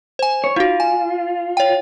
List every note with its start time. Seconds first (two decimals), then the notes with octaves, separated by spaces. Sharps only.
0.19 C5 G#5
0.44 C#5
0.56 D#4 F4 F#4
0.80 G#5
1.57 C#5 G5